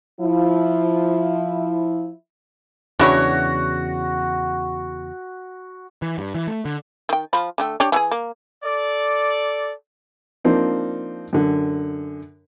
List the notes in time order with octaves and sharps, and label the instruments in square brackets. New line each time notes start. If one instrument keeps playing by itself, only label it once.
[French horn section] F3 E4
[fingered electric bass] E2 C#3 [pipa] D4 E4 C#5 [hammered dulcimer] F#4
[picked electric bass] E3
G2
E3
A3
D3
[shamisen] D#3 G5
F3 F4 B5
D3 A3 G5
D4 G4 C#5
E3 F#4 G#4
A#3
[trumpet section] A4 D5
[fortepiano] F3 A#3 C4 D4 D#4
F#2 D3